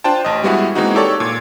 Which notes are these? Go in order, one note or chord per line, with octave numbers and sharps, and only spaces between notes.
D4 F4 C5 G5 A5
A1 D#5
G3 G#3 B3 E4 F#4 G#4
E3 G#3 A#3 C4 D#4 F#4
G4 A4 C#5 D5
A#2 G#6